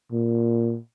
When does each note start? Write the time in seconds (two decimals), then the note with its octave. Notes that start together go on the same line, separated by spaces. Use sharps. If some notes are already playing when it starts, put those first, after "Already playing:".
0.12 A#2